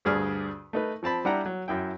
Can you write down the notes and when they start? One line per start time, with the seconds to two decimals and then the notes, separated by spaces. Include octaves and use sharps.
0.05 D2 G2 G#4 D5 F6
0.73 A3 D#4 B4
1.03 F3 C4 A5 B5
1.25 G3 D4 E4 F#5 G5 A#5
1.46 F#3
1.68 F#2 E4 G5